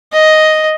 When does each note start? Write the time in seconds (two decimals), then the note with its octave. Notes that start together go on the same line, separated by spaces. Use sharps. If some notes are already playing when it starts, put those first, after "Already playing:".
0.13 D#5